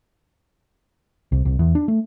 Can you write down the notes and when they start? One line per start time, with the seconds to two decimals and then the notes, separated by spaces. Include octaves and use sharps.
1.32 C2
1.45 C2
1.59 E2
1.75 D4
1.88 A3